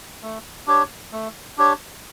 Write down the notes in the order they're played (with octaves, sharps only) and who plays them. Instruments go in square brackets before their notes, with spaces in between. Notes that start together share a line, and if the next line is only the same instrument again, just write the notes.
[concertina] A3
D4 G4 C#5
A3
D4 G4 C#5